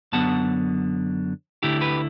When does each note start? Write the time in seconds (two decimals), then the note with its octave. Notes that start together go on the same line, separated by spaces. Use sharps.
0.12 F#2 D3 F#3 B3 F#5 A5
1.63 D2 D3 A3 E4 G4
1.81 G4 B4